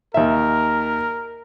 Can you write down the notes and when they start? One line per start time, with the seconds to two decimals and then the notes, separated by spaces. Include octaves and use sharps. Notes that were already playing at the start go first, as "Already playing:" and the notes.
0.14 D#2 A#4 E5